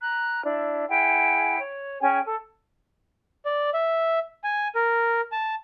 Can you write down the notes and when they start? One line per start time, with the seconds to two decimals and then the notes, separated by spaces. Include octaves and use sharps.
0.01 A#5 F#6
0.45 D4 E4
0.89 E4 G#4 F#5 G5
1.59 C#5
2.01 C#4 G#4 G5 G#5
2.24 A4
3.45 D5
3.74 E5
4.44 G#5
4.75 A#4
5.32 A5